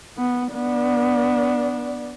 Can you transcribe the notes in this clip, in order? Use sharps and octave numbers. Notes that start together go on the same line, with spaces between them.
B3
B3 D4